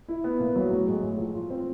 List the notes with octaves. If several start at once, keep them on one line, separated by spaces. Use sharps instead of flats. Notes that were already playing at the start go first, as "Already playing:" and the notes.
E4
B3
A#2
F#3
A2
G#3
A2
F3
F4
C4